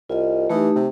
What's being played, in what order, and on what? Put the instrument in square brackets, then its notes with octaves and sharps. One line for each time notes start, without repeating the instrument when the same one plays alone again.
[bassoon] C2 [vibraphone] F4 D#5
[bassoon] E3 [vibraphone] A3 D#4 G4
[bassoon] C3